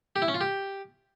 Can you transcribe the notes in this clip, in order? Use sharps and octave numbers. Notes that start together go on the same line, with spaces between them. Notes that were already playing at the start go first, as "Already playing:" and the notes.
G4
E4
C#4
F4
G4